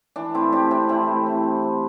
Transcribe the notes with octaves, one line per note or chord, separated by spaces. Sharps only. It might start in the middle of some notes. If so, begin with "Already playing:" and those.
E3 D4
A3 C4 E4
C4 D4 G4
C3 C4 E4
E3 C4 E4
A3
C4
C3
C4